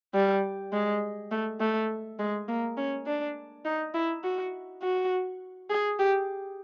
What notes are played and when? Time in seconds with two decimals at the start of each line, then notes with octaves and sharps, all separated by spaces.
0.14 G3
0.73 G#3
1.31 A3
1.60 A3
2.19 G#3
2.48 A#3
2.77 C#4
3.06 D4
3.65 D#4
3.94 E4
4.23 F#4
4.82 F#4
5.70 G#4
5.99 G4